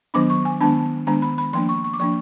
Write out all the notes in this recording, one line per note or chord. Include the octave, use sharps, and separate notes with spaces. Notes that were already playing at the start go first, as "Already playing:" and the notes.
D#3 F#3 B3 D4 D6
C#6
G#5
D#3 G#3 B3 D4 A5
D#3 G#3 B3 D4 A#5
B5
B5
F3 A#3 D4 C6
C#6
C#6
D6
F3 A#3 D4 C#6